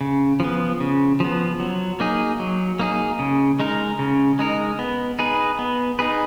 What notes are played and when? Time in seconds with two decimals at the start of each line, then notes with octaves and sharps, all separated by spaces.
0.01 C#3
0.40 F3 B3
0.80 C#3
1.20 F3 B3
1.60 F#3
2.00 A#3 D#4 G#4
2.39 F#3
2.79 A#3 D#4 G#4
3.19 C#3
3.60 G#3 D#4 A#4
3.99 C#3
4.39 G#3 D#4 A#4
4.79 B3
5.19 D#4 G#4 B4
5.59 B3
5.99 D#4 G#4 B4